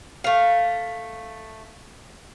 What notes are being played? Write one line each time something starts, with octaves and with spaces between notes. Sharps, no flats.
A3 F5